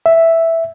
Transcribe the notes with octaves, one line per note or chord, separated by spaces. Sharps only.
E5